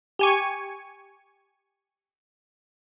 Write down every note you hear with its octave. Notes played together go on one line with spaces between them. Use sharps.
G4 G#5 C#6